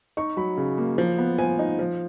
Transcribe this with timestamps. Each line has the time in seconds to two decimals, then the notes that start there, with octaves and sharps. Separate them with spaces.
0.17 D#4 C#6
0.37 F#3 B5
0.57 C#3
0.78 A#3
0.98 F3
1.18 B3
1.38 F3 G#5
1.59 D#4
1.79 F3